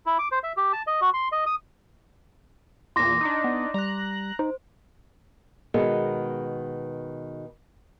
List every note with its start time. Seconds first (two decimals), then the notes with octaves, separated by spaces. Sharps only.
0.06 E4
0.19 D6
0.32 C5
0.43 E5
0.57 G4
0.73 A5
0.87 D#5
1.01 F#4
1.14 C6
1.32 D#5
1.46 D#6
2.96 E2 A#2 C6 D6 A#6
3.21 D4 D#4
3.44 B3
3.74 G3 A#5 F#6
4.39 D#4 C5
5.74 B2 D#3 G#3 B3